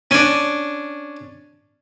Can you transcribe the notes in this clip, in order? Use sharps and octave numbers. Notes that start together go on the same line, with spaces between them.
C#4 D4